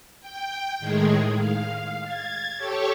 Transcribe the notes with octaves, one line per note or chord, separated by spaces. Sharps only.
G5
A2 D#3 G#3 G#4
F5
G#6 A6
G4 A4 C#5 C#6